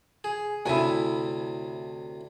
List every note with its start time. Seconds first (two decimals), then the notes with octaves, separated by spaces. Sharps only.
0.24 G#4
0.66 D2 A2 C3 E4 G#5